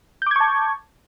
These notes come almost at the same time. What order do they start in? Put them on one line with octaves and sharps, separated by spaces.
G6 D6 G#6 C#6 A5